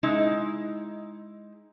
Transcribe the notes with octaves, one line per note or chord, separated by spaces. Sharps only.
G#3 D#4 E4